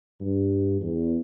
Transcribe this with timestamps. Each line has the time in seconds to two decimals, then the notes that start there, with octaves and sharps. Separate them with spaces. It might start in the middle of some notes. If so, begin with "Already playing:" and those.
0.21 G2
0.81 E2